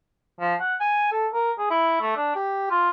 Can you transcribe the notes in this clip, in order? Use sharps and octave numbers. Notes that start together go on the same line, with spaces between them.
F3
F#5
G#5
A4
A#4
G#4
E4
A3
D4
G4
F4